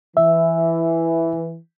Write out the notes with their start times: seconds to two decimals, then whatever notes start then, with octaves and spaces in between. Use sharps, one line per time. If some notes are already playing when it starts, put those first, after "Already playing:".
0.17 E3 E5